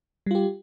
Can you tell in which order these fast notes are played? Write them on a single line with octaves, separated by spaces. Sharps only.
G3 F4 G4